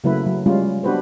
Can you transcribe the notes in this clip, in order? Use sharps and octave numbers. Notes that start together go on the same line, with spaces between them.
C#3 F#3 A3 A#3 E4 B4
F#3
G3 G#3 C#4 F4
B3 D4 F#4 G4 B4 C5